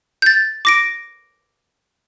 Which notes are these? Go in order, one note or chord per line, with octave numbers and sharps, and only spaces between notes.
G6 A6
D6 A#6 D7